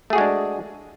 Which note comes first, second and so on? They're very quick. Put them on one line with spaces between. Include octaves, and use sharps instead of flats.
A3 G#4 F#4 G#3 D4